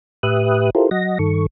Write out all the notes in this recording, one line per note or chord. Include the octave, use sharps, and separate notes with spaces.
A2 G4 B4 E5 D#6 F#6
E4 F4 G4 A4 A#4 C5
F#3 D#5 F#5 A#6
G2 D#3 A4 C#6